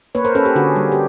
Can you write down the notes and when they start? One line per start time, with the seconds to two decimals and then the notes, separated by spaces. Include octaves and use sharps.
0.15 A#3 B4 C#5
0.25 A#4 C5
0.35 C#4 A4 B4
0.45 G4 A4
0.56 D3 F#4 G#4
0.76 G3
0.92 G4